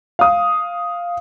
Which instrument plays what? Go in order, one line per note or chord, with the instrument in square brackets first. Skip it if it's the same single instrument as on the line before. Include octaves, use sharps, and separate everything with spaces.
[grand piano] F5 D#6